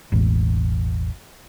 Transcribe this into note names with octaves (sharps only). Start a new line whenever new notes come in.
E1 A1